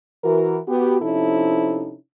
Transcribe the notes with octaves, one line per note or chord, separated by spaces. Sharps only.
E3 F#4 A#4
B3 F#4 G4
C3 F3 C#4 D#4 E4 A4